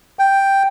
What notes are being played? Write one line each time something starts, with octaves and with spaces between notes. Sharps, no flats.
G5